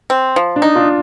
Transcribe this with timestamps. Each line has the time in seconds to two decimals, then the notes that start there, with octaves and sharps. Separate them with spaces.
0.10 C4
0.36 F3
0.56 D4
0.62 D#4
0.75 D4 F4